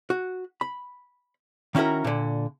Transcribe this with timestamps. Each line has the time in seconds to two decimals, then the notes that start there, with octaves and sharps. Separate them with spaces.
0.10 F#4
0.61 B5
1.75 D#3 C#4 E4 F#4 A#4
2.05 A#2 D3